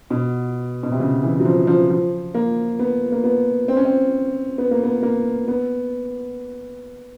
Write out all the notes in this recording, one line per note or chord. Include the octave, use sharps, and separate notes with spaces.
B2
B2
C3
C#3
E3
F#3
F3
F3
F3
A#3
B3
A#3
B3
C4
C#4
C4
B3
A#3
B3
A#3
B3